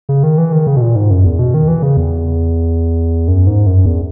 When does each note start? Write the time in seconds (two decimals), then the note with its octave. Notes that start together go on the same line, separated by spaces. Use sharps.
0.09 C#3
0.23 D#3
0.38 E3
0.52 D#3
0.67 C#3
0.76 B2
0.81 A#2
0.96 G#2
1.10 F#2
1.25 E2
1.39 B2
1.54 D#3
1.68 E3
1.83 C#3
1.97 E2
3.28 F#2
3.47 G#2
3.66 F#2
3.85 E2